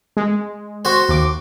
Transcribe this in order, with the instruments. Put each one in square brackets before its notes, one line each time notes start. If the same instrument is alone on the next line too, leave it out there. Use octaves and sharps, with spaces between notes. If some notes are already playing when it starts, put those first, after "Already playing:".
[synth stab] G#3
[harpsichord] F#4 C5
[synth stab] D#2 D6